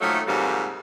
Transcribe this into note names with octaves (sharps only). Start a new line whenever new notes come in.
A#2 D#3 F3 F#3 A3
F2 G#2 C3 F#3 G3 A#3